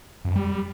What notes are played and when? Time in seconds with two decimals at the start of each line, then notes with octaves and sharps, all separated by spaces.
0.25 F2
0.30 F#2
0.36 G3